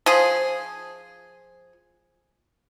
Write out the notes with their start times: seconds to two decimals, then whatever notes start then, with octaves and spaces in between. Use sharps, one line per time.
0.06 F3 G#4